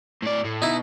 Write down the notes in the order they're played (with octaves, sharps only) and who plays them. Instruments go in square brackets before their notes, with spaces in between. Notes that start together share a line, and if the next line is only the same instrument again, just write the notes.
[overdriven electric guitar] A2 D5
A2
[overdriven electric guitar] B2 [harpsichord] D#4 E4